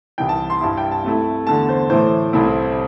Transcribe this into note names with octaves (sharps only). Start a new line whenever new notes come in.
C2 C3 E3 G5
A5
C6
G2 G3 E4 A5
G5
A5
C3 A3 E4
E2 D3 A3 A5
C5
A2 E3 A3 C5
C2 C3 A3 C4 E4